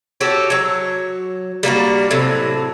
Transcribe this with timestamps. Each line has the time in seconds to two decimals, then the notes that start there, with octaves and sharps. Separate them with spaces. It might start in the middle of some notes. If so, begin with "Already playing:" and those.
0.21 F#4 G4 A4 C#5
0.50 F#3 C#5
1.63 G3 A#3 D4 F#4
2.11 A2 C3 F#3